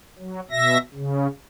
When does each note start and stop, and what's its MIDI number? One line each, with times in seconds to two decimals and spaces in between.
0.18 0.40 54
0.51 0.78 47
0.51 0.78 76
0.51 0.78 94
0.94 1.27 49